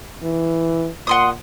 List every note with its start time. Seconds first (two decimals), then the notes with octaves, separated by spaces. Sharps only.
0.23 E3
1.07 A#2 F#5 C6 D#6